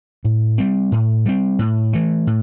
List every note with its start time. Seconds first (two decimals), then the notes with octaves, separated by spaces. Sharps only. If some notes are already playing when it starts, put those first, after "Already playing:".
0.25 A2
0.58 G3 C4
0.92 A2
1.26 G3 C4
1.59 A2
1.93 E3 A3
2.27 A2